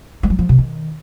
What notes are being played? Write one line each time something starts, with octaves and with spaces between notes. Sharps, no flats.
G#3
F#3
F3
C3
D#3